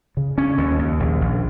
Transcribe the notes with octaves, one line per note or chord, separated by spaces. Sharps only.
C#3
C#4
D#2
D#2
A#1
A#1